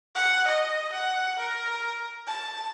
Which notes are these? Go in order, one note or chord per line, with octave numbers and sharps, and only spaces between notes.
F#5
D#5
F#5
A#4
A5